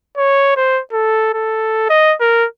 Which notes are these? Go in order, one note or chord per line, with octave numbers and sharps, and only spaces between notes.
C#5
C5
A4
A4
D#5
A#4